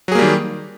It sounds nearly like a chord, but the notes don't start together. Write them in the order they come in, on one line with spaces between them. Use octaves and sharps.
F#3 G#4 A#3 G3 D#3